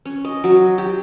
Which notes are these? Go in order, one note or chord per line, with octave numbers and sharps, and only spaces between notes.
C#4
D#5
F#3
G4